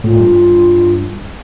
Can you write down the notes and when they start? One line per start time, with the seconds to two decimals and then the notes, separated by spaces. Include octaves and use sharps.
0.04 A2 F4
0.20 G2